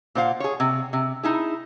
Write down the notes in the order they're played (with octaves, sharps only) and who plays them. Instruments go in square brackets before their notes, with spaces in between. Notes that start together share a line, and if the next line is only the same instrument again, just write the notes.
[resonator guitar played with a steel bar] A#2 C5 F5 F#5
G#4 C#5
C3
C3
D#4 E4 G#4